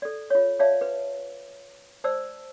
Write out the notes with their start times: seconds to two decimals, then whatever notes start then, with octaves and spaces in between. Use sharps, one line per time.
0.02 A4 D5
0.30 F4 C#5
0.59 C#5 D5 E5 F5 A5
0.81 B4
2.04 C5 D5 A5 E6